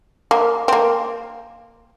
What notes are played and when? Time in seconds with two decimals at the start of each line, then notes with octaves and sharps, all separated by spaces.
0.31 A#3
0.68 C4
0.73 A#3